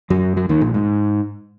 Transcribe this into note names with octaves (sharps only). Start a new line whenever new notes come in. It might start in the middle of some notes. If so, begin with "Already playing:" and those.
F#2 F#3
F#3
D#2 D#3
A#1 A#2
G#2